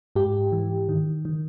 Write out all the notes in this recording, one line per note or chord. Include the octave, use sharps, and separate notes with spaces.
G#2 G4
E3
D#3
D#3